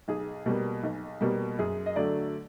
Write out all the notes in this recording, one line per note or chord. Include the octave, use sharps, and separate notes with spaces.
B1 G#4
B2 G3 A#3
B1
B2 G3 A#3
F#2 G#4
D#5
D3 F#3 A3 D5